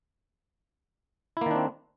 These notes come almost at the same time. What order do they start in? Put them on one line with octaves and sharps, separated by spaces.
E4 A#3 D#3 D4 C4